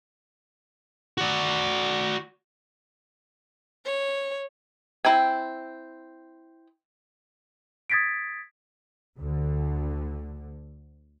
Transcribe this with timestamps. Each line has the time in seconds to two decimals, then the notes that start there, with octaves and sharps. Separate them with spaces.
1.18 F#4 D5
3.85 C#5
5.05 C4 E4 G5 G#5
7.90 D#6 G#6 A6 B6 C7 D7
9.17 D2 D3